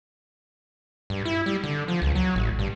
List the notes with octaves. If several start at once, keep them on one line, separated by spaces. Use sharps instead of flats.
G2
E4
G3
D3
F3
C#2
F#3
A1
G2